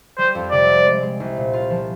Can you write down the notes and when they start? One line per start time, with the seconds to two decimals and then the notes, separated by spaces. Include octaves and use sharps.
0.18 G3 C5
0.35 F2
0.51 C3 D5
0.69 G3
0.86 G#3
1.03 G#3
1.20 C2
1.37 A#2
1.53 F4
1.70 F3